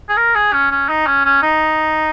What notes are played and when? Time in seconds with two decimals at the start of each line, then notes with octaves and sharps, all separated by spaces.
0.09 G#4
0.17 A#4
0.35 G#4
0.53 C#4
0.71 C#4
0.89 D#4
1.07 C#4
1.25 C#4
1.42 D#4